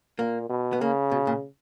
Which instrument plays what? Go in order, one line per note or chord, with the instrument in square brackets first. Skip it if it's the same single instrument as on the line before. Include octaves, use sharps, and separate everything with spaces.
[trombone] A#2 [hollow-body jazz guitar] A#3
[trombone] B2
[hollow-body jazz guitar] B3
[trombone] C#3 [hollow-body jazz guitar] A#3
[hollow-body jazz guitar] B2
A#2